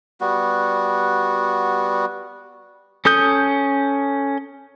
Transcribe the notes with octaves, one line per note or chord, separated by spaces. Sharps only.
G3 B3 F#4
C#4 A4 D#6 G6